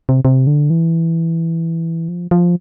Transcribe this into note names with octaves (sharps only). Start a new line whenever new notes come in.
C3
C3
D3
E3
F3
F3